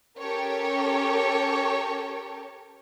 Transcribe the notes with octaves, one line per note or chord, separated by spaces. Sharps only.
C#4 G4 A4 A#4 C#5